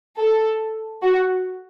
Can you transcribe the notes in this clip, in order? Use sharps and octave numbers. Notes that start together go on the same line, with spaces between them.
A4
F#4